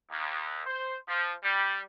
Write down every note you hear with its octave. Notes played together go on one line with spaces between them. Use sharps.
D#2
C5
F3
G3